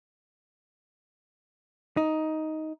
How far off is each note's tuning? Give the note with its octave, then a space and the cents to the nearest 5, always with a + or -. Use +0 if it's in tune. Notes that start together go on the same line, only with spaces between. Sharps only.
D#4 +10